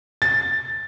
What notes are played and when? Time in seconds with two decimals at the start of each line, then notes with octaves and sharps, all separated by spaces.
0.22 A6